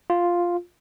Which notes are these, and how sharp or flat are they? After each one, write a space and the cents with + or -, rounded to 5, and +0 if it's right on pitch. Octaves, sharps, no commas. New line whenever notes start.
F4 +0